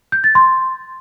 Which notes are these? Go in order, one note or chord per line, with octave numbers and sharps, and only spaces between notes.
G6
A6
C6